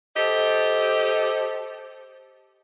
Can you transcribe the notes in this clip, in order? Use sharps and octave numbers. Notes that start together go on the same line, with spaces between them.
G4 A4 C5 D#5